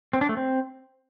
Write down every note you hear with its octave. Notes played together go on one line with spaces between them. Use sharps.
C4
D4
A3
C4